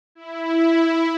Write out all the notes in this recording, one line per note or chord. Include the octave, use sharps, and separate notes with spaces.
E4